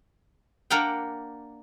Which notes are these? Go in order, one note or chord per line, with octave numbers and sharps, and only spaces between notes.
A#3 D4 A#4 F#5 G5